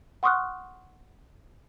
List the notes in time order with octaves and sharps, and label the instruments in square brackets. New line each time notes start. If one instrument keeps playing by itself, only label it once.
[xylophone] F#5 C6 C#6 D#6 F6 F#6